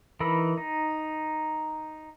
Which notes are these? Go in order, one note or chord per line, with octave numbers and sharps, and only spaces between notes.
E3 D#4 A#4 B5 E6
D#4